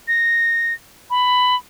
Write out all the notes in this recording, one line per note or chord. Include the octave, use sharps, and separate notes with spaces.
A#6
B5